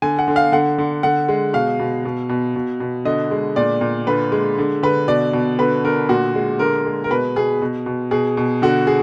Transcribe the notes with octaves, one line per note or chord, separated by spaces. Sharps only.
D3 G#5
F#5
D3
F5
D3 F#5
D3
D3 F#5
G#3
B2 F5
B2
B2
B2
B2
B2
D3 D#5
G#3
A#2 D5
A#2
D3 B4
G#3
D3
D3 B4
B2 D5
B2
D3 B4
D3 A#4
A#2 F#4
G#3
D3 A#4
G#3
A#4
B2 B4
B2 G#4
B2
B2
B2 G#4
B2
D3 F#4
G#4